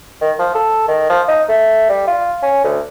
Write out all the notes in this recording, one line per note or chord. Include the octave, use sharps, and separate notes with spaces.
D#3
F3
A4
D#3
F3
D#4
A3
G3
F4
C#4
D2